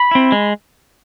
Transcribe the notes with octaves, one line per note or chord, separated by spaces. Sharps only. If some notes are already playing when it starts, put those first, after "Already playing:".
Already playing: B5
C4 E4
G#3